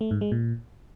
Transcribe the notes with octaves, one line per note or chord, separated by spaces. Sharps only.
A3
G#2
G#3
A#2